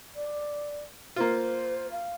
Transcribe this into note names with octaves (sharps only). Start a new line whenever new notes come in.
D5
A#3 F4 C5
F5